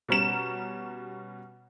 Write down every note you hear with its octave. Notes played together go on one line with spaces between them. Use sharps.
B2 G3 C#4 A#5 E7